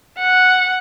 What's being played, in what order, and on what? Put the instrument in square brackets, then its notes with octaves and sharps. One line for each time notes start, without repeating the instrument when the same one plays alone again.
[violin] F#5